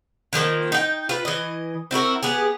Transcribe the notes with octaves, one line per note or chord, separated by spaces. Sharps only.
D3 D#3 F3 A#3
D#4 G5
F4 B4
E3 D#5
C4 E4 F#4 A#4
B3 G4 G#4